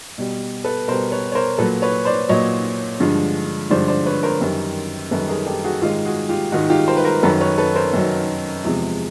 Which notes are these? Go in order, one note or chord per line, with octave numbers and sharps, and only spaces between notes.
B2 G3
A4 B4
B2 G3 A#4 C5
B4 C#5
C#5
A#4 C5
A#2 F#3 A4 B4
B4 C#5
C5 D5
A#2 F#3 C#5 D#5
G2 D3 F3 G#3
G2 D3 F3 G#3 C5 D5
C5 D5
B4 C#5
A#4 C5
F#2 D#3 G3
F#2 D#3 G3 A4 B4
G#4 A#4
G4 A4
F#4 G#4
G#2 D#3 G#3 F4 G4
F#4 G#4
F4 G4
G#2 D#3 G#3 F#4 G#4
F4 G4
A#4 C5
B4
A#4 C5
F#2 D#3 F#3 A4 B4
B4 C#5
A4 B4
A#4 C5
F#2 D#3 F#3
E2 C3 F3 G#3